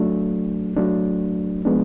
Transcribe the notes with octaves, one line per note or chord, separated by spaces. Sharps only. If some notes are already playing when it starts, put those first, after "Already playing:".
Already playing: F#3 A3 D4
F#3 A3 D4
F3 G#3 B3 D4